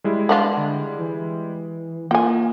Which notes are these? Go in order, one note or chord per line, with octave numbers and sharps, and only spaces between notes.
G3 G#3 E4
B3 D4 F4
D3
E3
A#3 F4 G5 G#5